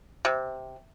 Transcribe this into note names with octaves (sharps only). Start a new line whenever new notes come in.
C3